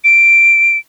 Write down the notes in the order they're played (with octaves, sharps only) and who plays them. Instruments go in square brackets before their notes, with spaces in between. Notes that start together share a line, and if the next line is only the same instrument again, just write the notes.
[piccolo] D7